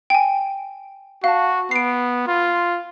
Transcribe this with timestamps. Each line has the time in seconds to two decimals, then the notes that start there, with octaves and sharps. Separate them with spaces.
0.10 G5 G#5
1.24 F#4 F5 A5
1.71 B3 C7 D7
2.28 F4